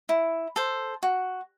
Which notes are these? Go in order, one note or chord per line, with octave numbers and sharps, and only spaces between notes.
E4
A4 C5
F#4